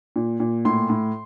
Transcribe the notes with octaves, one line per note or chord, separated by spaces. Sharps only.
A#2
A#2
A2 C6
A2